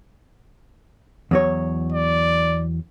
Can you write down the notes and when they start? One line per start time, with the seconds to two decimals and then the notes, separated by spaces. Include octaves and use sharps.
1.31 E2 F#3 C#5
1.92 D5